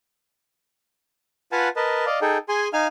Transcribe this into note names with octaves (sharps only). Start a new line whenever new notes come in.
F4 B4 F5 F#5 G#5 A5
A#4 B4 D#5 A5
D5 D#5 F5
D#4 G#4 A4 G5
G#4 G#5 C6
D#4 F5 G#5 F6